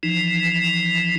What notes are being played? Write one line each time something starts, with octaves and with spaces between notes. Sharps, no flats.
E3 F3 D#4